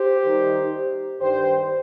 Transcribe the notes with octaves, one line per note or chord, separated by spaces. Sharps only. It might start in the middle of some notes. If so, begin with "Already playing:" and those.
Already playing: G4 C5
D#3 G3 D#4
G2 D#3 G3 G4 C5